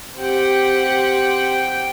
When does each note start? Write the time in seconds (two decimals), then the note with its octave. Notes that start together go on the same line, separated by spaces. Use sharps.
0.17 C4 G4 F#5 G5